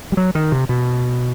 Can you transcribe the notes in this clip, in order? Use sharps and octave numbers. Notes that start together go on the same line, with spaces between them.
G3
F#3
D#3
C3
B2